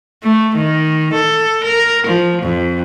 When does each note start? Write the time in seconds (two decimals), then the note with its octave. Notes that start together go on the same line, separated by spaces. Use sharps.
0.24 A3
0.56 D#3
1.14 A4
1.65 A#4
2.07 F3
2.43 F2